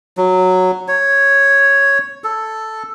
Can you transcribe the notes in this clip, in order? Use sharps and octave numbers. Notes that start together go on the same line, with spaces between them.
F#3
C#5
A4